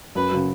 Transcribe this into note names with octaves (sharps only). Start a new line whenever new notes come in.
F#2 B4
C#3 F#3